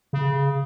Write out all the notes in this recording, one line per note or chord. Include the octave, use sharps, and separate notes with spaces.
C#3